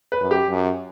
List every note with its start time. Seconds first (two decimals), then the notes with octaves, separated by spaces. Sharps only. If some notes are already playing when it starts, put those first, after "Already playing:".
0.12 B4
0.21 F#2
0.31 G4
0.50 F#2